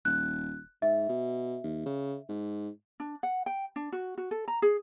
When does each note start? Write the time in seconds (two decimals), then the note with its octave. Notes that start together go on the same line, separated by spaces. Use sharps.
0.05 D#1 F#6
0.82 G#2 E5
1.09 B2
1.64 D#2
1.86 C#3
2.29 G#2
3.00 D4
3.23 F#5
3.46 G5
3.76 D4
3.92 F#4
4.18 F#4
4.31 A4
4.48 A#5
4.62 G#4